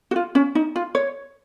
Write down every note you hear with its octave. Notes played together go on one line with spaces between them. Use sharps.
F#4
F4
C#4
D#4
F4
C#5